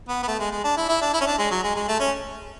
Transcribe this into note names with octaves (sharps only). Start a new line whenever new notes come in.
B3
B3
A3
G#3
G#3
D4
E4
E4
D4
E4
C#4
D4
G#3
F#3
G#3
G#3
A3
C#4